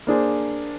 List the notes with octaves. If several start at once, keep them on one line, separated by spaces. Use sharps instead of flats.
A#3 D4 G#4 C5